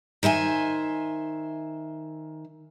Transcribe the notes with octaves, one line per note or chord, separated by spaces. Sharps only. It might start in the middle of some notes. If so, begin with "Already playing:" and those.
D#3 C5 E5 G#5